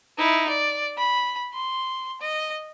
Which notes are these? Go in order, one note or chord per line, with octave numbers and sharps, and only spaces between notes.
D#4 E4
D5
B5
C6
D#5